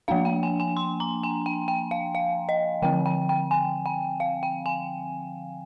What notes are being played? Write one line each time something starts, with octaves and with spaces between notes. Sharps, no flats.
F3 A#3 D4 F5
G5
G#5
G#5
C6
A#5
G#5
G5
G5
F5
F5
D#5
D3 F3 C4 G5
G5
G5
G#5
G5
F5
G5
G#5